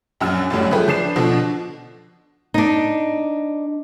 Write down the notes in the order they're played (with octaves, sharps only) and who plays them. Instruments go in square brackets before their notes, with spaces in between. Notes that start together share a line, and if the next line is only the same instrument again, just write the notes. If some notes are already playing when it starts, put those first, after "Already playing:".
[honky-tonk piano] A#1 F#2 E6 F6
A1 F#2 A2 F#3 G3
F3 A3 G#4 B4 G5
F3 D4 C7 E7
B2 D3 F3 D4
[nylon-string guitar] D4 D#4